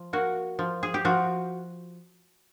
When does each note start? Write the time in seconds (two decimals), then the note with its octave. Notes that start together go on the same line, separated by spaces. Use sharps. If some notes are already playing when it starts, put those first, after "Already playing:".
Already playing: F3
0.13 A#3 F#4
0.59 F3
0.83 G#4
0.94 G4
1.05 F3 F#4